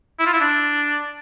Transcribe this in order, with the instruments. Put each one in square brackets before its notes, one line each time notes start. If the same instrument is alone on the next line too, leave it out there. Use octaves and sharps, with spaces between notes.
[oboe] E4
F4
E4
D4